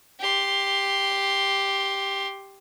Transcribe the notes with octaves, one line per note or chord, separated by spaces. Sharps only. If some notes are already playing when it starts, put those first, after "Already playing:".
G4 C6